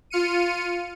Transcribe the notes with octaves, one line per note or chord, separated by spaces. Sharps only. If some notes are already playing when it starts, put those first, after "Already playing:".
F4 F6 C#7 D#7